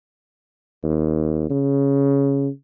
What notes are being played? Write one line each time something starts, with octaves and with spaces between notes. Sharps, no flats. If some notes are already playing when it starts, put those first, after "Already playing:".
D#2
C#3